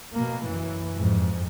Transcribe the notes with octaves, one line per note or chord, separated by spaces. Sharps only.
B2 A#3
F#2 E3
F2 G#2